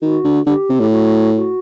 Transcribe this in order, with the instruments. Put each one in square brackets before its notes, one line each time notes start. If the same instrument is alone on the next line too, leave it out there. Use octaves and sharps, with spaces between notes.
[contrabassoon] D#3 [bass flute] F#4
[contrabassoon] D3
[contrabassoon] D3 [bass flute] G4
[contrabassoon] C3
A2
[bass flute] F#4
F#4